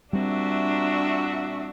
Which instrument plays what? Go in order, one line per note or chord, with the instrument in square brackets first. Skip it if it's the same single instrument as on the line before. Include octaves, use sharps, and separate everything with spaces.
[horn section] A#2 F#4 E5 [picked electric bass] G3 C4 [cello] D4